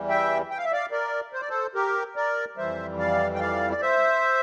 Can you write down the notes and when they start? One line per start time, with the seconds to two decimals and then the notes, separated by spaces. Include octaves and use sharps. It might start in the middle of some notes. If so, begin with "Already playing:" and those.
Already playing: E2 E3 G3
0.09 E5 G5
0.51 G5
0.58 F5
0.65 E5
0.72 D5 F5
0.91 A#4 D5
1.33 C5
1.41 D5
1.49 A4 C5
1.74 G4 A#4
2.16 A#4 D5
2.57 F2 E3 G3 C5 E5
2.99 D5 F5
3.34 G5
3.40 D5 F5
3.70 D5
3.82 C5 E5